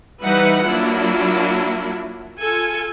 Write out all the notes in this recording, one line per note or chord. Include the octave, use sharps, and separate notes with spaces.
E3 G3 D#4 B4 E5 F#5
F#3 A#3 D4 E4 F4
F4 A4 G#5